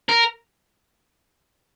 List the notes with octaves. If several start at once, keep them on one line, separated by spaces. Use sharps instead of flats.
A#4